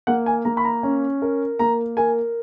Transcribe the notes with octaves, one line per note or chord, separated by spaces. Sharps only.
A#3 F#5
G#5
A#3 A#5
B5
A#5
C#4
A#4
A#3 A#5
A#4 G#5